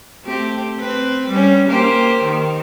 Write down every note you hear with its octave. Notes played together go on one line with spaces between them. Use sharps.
A3 C4 G4
C4 B4
G3 C#4
A#3 G4 C5
D#3